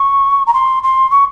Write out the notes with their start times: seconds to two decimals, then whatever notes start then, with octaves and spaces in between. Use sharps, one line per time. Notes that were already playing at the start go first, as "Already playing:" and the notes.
Already playing: C#6
0.46 A#5
0.53 C6
0.83 C6
1.11 C#6